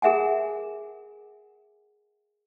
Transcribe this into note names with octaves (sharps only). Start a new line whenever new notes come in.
G#4 A#4 E5 F#5 G#5